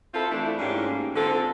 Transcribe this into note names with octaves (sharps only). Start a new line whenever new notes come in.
C4 E4 F4 A4
E3 A3 D4 E4
G#2 F3 A#3 C#4 G4
D3 C4 F4 A4